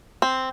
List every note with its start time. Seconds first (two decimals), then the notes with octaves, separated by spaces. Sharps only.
0.22 C4